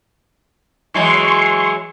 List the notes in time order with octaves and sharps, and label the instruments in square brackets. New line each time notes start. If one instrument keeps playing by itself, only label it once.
[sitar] E3 F#3 G#3 [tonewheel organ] C6 C#6